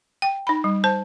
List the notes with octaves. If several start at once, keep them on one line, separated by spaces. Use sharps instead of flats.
G5
D#4 B5
G3
C5 A5